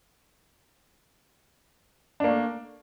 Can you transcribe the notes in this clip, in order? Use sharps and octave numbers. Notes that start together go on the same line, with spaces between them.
A3 A#3 D4